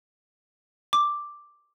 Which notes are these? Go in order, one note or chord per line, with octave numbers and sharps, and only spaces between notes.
D6